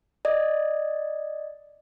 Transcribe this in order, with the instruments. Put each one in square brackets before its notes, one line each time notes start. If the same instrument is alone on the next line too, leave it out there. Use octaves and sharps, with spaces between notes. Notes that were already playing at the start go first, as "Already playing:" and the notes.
[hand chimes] D5 D#5